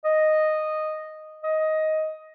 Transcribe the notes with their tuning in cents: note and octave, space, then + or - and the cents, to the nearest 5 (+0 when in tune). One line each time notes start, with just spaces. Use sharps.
D#5 -5
D#5 +10